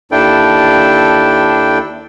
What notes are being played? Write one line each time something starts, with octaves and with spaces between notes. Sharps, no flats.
D#2 D4 E4 A4 G5